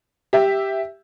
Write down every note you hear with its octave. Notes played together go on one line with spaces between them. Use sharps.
G4 E5